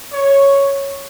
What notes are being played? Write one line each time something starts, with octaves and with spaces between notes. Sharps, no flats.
C#5